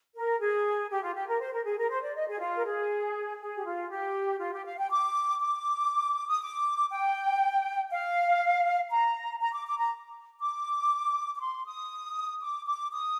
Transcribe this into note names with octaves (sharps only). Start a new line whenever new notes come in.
A#4
G#4
G4
F4
G4
A#4
C5
A#4
G#4
A#4
C5
D5
D#5
G#4
F4
A#4
G#4
G#4
G4
F4
G4
F4
G4
F5
G5
D6
D6
D#6
D6
G5
F5
A#5
A#5
D6
D6
A#5
D6
D6
C6
D#6
D6
D6
D#6